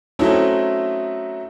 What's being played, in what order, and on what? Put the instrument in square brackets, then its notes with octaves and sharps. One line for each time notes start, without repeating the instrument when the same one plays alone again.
[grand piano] F#3 A3 C4 C#4 D#4 E4